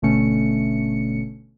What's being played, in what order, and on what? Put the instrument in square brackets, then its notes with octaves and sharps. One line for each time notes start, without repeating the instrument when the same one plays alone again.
[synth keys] G1 B2 D3 A3 C#4 C#7